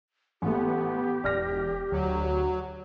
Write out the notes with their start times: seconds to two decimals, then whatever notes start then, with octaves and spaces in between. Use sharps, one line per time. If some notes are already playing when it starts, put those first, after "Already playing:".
0.42 A1 A3 B3 G4
1.24 E1 D5 F6 A#6
1.92 D2 F#3